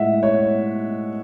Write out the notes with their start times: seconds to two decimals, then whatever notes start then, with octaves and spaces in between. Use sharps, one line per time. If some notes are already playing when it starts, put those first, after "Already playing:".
Already playing: A2 G#3 E5 F#5
0.23 C#5